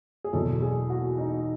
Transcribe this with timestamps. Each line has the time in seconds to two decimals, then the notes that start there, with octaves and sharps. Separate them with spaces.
0.24 G#4
0.33 E2 B2 F#3 A4
0.62 G#4
0.90 F#4
1.18 D#4